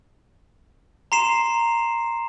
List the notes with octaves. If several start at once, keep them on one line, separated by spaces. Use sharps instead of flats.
A#5 C6 C7 E7